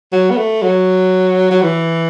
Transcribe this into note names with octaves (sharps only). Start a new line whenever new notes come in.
F#3
B3
A3
F#3
F#3
E3